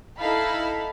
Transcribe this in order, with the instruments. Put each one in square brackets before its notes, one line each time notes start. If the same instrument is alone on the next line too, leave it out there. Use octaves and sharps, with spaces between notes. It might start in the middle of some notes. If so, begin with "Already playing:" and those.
[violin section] D#4 E4 A4 F5 A5 B5